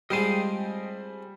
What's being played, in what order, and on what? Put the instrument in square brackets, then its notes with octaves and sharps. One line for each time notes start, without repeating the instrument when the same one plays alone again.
[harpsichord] F3 G#3 C4 [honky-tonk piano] G3 D#7 [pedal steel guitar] D#5 G5 C6